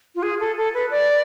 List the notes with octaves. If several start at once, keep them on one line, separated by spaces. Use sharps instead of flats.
F4
G#4
A4
A4
B4
D5